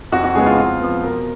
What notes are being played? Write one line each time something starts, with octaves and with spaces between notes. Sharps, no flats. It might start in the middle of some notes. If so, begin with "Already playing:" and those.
F2 F#4
F#4
C#3 G#3 B3 G#4
F4
F2 F4
F3 B3
B2 A#4